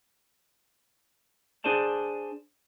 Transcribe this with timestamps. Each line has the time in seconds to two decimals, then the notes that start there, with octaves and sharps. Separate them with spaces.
1.64 D4 G#4 C5 D5 A5